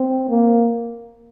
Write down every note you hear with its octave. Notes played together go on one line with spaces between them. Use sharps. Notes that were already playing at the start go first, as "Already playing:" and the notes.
Already playing: C4
A#3